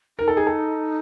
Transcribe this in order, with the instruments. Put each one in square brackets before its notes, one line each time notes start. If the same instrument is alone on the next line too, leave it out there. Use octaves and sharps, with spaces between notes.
[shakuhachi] D#4 [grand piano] A#4
[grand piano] A4
G#4
A4